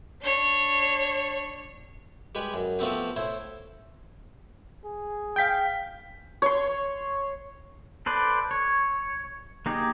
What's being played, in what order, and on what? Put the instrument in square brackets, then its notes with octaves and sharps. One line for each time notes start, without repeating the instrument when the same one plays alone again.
[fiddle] D4 C#5
[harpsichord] G3 G#3 G4 B4
F#2
F3 A3 B3 C4 G4
A2 E4 C5
[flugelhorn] G#4
[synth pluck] F5 G5 [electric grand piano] G6 B6
[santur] C#5 C6
[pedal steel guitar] A4 B4 C5 D5
C#5
A#3 D#4 G4 G#4